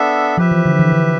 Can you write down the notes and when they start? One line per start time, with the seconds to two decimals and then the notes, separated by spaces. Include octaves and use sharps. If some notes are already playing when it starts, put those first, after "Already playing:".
Already playing: B3 D4 A4 E5
0.37 F3 G4 B4 E5
0.51 E3
0.65 D3
0.79 E3
0.92 D3